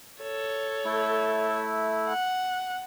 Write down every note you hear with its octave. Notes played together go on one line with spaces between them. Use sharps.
A4 C#5
A3 E4
F#5